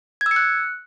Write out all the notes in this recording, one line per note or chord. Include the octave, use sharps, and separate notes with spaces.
G#6
E6
C#7
F#6